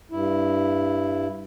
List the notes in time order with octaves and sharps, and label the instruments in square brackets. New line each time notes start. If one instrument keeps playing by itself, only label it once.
[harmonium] G2 E4